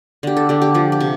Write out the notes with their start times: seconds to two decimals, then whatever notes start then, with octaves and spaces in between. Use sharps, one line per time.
0.23 D3 G4
0.37 A4
0.49 D3 G4
0.62 G4
0.74 F3 G4
0.92 G4
1.00 C3